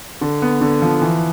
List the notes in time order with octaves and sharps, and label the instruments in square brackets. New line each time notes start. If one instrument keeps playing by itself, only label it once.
[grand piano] D3
B3
D3
F3
E3